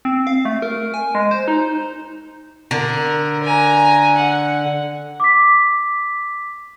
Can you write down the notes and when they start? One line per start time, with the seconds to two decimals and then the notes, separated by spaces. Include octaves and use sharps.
0.05 C4
0.27 F5
0.45 A3
0.62 A#4
0.94 G#5
1.15 G#3
1.31 C5
1.48 D#4
2.71 D3 A#4
3.43 G#5 A#5
4.16 F#5
5.20 D6 B6